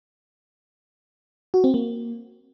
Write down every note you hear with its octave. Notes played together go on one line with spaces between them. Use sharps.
F#4
C4
A#3